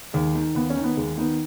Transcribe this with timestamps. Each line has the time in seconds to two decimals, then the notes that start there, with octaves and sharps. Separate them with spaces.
0.13 D#2 G#3
0.35 D#3
0.55 D#2 B3
0.70 C#4
0.76 D#3
0.84 B3
0.97 D#2 G#3
1.18 D#3 B3